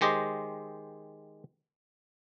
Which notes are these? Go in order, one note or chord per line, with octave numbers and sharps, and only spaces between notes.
D#3 G#3 G4 C5 D#5